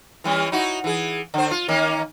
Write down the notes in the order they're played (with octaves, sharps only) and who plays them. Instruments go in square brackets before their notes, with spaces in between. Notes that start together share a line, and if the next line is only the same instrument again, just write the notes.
[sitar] E3 G3 C#4
D#4 E4 F#4
E3 G#4
D3 C5
F4
D#3 A#3 C#4